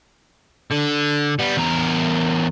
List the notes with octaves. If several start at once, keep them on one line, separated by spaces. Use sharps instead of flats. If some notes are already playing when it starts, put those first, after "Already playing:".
D3
G3 B3
E2 A#4